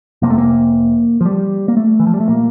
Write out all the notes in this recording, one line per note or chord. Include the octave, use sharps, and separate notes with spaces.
F1 F2 C3 A#3
A3
A#3
F3
G3
A#3
A3
E3
F3
G3
A3
A#2 A#3